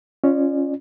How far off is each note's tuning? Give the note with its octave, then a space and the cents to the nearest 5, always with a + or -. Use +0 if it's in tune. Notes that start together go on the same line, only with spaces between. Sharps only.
C#4 +0 F4 -10 D5 +35